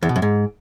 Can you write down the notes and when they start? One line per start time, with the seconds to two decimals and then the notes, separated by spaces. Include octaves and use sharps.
0.03 E2
0.09 B2
0.16 F#2
0.22 G#2